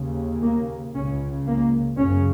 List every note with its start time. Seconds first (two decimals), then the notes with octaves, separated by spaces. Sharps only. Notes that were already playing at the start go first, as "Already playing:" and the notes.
Already playing: D#2 C#3
0.42 A#3
0.94 C#2 C#3 C#4
1.46 A#3
1.97 F#2 C#3 C#4